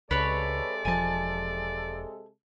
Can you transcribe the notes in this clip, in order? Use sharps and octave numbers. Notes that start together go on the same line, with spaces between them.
C#2 C3 G#3 A4 B4 C#5 D5
E1 F3 G#5 A5